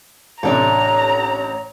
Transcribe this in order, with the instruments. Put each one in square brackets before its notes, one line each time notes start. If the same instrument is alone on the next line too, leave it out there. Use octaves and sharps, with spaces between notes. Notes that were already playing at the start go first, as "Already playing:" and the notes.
[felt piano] A1 [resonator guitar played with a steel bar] C3 D4 A4 [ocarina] C#5 [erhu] A#5